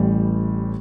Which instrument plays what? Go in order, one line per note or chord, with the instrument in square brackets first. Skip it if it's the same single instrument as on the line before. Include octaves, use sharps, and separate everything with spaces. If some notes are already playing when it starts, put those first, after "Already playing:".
Already playing: [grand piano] A1 A2 E3 G3